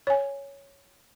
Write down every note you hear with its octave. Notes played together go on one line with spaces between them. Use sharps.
C#5 G#5